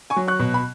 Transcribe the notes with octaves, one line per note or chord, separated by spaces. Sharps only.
G#5 C#6
F#3
C#6 F#6
B2
B5